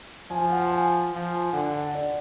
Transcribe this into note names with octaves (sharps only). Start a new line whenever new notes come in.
F3 G#5
F#5
G#5
F3
D3 F#5
F#5
D5